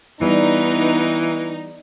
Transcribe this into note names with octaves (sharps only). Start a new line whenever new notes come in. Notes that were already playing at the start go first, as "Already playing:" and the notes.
E3 G3 B3 D#4